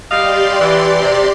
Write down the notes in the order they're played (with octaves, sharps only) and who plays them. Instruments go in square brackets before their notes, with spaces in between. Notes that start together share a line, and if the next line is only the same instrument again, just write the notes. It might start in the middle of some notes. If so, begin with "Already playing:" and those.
[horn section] G3 D#5 F5 [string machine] G4 D5 C6
[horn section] E3
C3